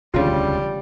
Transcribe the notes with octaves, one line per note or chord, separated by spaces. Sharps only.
E1 D2 C#3 G3 D4 F4